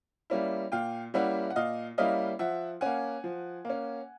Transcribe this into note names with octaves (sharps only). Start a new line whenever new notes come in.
G3 A#3 C#4 E4
A#2 F5 G5
G3 A#3 C#4 E4 E5 F#5
F#5
A#2 D#5 F5
G3 A#3 C#4 E4 D#5 F5
F3 E5 F#5
A#3 C#4 F#5 G#5
F3
A#3 C#4